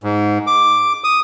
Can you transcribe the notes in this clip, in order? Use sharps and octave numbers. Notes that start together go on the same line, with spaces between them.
G#2
D6
D#6